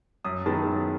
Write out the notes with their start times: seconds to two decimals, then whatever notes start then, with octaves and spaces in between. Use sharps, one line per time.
0.25 F#2 D#6
0.46 D#3 G#3 B3 A5
0.67 F#2